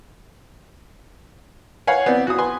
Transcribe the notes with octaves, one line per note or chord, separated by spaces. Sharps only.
B4 C#5 F5 F#5 G#5
B3 C4 D5
F#4 D#6
B4 G#5 C6